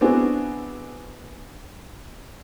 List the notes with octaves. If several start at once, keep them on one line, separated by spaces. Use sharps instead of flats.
B3 C4 D4 E4 F#4 G#4